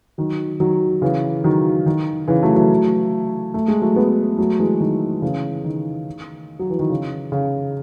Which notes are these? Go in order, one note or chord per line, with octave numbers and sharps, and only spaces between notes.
D#3 F#3
D#3 F#3
C#3 E3
D#3 F#3
D#3
C#3 E3
F#3 A3
F#3 A3
A3
G#3
F#3 A3
G#3 B3
F#3 A3
E3 G#3
D#3 F#3
C#3 E3
D#3
F#3
E3
D#3
C#3
C#3